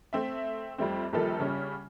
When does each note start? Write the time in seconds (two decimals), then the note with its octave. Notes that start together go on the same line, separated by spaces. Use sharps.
0.13 A3 C4 E5
0.78 F2 G3 A3 C4
1.13 A#1 D#3 F3 G3 A4
1.40 C#3 G3 C#4